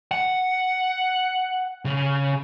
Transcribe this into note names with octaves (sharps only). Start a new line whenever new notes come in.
F#5
C#3